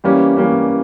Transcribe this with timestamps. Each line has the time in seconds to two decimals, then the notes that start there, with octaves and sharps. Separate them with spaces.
0.04 E3 G3 A#3 C#4
0.37 E3 G3 A#3 C#4